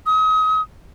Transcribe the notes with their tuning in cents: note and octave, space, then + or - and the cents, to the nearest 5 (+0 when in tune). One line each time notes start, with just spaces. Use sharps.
D#6 +35